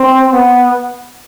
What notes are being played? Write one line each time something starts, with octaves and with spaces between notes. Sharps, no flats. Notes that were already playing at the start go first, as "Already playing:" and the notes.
Already playing: C4
B3